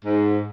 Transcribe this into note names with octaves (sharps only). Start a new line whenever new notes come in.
G#2